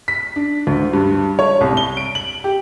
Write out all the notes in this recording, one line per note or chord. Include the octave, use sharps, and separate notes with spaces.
B6
D4
D2
G2
C#5
C2
G7
D7
F#7
G4